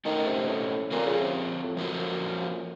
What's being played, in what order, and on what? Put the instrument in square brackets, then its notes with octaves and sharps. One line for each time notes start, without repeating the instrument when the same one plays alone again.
[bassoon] D#3 [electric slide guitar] A3 C#4 A4 C5 D#5
[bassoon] C3
A2
[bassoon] A#2 [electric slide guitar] F3 C4 F4 A#4
[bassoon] C#3
C3
A2
[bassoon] F#2 [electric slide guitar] F3 A#3 F4 A4 C5